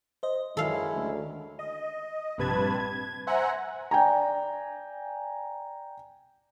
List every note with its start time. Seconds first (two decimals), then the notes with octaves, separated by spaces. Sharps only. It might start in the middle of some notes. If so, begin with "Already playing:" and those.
0.23 C5 D#5
0.57 F#2 D#3 G#3 C#4 E4 A4 F5
0.93 D2
1.59 D#5
2.38 A#1 G2 C3 B4 A5 G#6
2.80 G#6
3.27 C5 E5 F#5 G#5 A#5
3.91 D5 G5 G#5 A#5